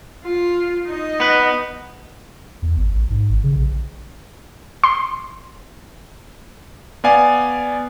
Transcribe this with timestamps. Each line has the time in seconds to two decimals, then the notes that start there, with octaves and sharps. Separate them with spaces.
0.24 F4
0.87 D#4 D#5
1.20 B3 B4
2.62 E2
2.76 G#1
2.93 A1
3.10 G#2
3.29 G#1
3.44 C#3
3.56 A#1
4.84 C6
7.04 B3 D5 F5 G#5